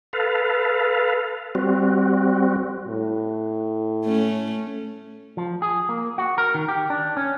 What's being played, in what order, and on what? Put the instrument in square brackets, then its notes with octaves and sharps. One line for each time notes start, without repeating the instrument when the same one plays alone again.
[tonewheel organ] A4 B4 F5
G3 C4 F#4
[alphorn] A2
[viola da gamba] A3 C#4
[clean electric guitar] F3
G#4
A#3
F#4
A#4
D#3
G4
D4
C#4